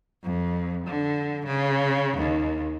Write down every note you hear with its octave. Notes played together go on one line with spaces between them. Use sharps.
F2
D3
C#3
D#2